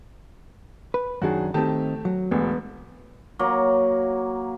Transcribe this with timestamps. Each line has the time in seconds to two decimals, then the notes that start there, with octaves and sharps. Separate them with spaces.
0.94 B4
1.22 F#2 D#3 D4 F#4 G#4
1.54 D#3 A3 C4 G4 A5
2.05 F#3
2.31 E1 D2 B3
3.39 F#3 A#3